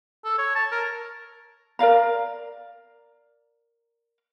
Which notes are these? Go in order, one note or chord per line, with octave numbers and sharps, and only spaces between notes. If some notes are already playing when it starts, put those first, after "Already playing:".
A4
C#5
A5
A#4
A#4 D5 F5 A#5